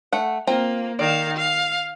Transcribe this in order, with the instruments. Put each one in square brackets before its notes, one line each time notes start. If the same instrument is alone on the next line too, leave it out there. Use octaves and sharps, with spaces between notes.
[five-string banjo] A3 F#5
[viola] A#3 [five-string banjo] C4 F4 A#5
[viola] D#3 F5 [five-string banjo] D5
[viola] F5